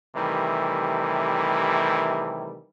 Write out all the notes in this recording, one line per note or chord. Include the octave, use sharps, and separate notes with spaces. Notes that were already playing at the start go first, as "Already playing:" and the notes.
C3 D#3 E3 G3 A3